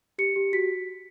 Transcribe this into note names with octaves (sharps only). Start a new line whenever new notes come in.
G4 C#7
G4
F#4 B6